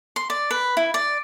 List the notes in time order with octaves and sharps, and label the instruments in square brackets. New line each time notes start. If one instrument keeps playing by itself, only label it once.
[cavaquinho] C6
D5
B4
E4
D5